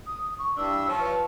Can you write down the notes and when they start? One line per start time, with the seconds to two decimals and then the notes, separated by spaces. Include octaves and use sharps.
0.07 D#6
0.39 C#6
0.57 G2 E3 D4 E6
0.87 F3 C#5
0.99 B4